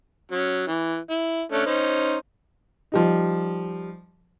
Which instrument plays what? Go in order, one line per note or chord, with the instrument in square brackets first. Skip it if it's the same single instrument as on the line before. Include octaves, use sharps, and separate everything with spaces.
[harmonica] F#3 C#4
E3
E4
A3 C#4 D4
C#4 D#4 C5
[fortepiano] F3 G3 D#4